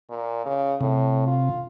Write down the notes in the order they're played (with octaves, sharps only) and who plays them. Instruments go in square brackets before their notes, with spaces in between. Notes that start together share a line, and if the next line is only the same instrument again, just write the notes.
[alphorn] A#2
C#3
[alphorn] A2 [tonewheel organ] C3
[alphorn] F4